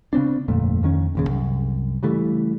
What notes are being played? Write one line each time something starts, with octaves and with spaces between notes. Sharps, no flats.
C#3 B3 C4 D4
G1 F2 A#2 A3
F2 D#3 C#4
D#1 D#2 C#3
C2 F#2
C#3 E3 G3 A3